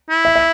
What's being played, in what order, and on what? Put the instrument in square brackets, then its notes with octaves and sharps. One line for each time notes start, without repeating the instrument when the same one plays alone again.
[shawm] E4
[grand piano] E5
E5